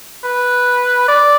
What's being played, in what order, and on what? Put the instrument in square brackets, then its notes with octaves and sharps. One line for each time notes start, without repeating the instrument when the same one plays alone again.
[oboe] B4
D5